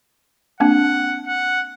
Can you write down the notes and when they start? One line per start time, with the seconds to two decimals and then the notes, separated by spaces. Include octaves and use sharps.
0.60 A#3 C4 D4 F#5
1.27 F#5